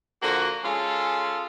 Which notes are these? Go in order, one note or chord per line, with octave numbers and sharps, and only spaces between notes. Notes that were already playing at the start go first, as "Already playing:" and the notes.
D3 F3 A#3 F#4
G#3 C#4 F4 G#4 A4